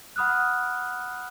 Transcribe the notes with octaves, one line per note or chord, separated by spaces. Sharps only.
F#5 B5 D#6 F6 F#6